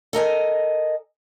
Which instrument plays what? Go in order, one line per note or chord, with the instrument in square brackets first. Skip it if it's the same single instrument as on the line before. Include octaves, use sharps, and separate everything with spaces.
[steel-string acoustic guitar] A4 A#4 D#5 G#5